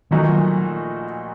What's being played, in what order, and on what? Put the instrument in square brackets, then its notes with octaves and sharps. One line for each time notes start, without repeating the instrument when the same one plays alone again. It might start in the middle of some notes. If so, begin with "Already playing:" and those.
[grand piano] A#1 A#2 A3 D#4 F#4 [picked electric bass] D#3 F#3